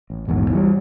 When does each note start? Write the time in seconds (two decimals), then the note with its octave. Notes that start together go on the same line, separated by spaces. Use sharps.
0.10 A1
0.28 A#1 E2 G#2
0.51 E3 F#3 G3